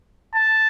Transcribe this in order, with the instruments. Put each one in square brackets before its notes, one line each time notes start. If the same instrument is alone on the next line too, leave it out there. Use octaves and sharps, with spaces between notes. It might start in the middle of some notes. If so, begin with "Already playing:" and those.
[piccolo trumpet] A5